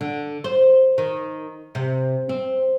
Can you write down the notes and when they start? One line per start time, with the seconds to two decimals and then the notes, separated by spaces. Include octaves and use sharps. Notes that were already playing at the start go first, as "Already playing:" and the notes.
0.01 D3
0.44 C5
0.98 D#3
1.75 C3
2.29 C4